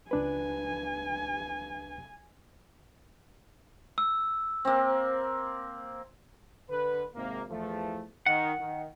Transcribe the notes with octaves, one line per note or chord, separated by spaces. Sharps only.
C#2 D4 B4 G#5
E6
A#3 C4
D3 B4
G#1 C3 A#3
E2 F3 A3
D#3 F#5
D#3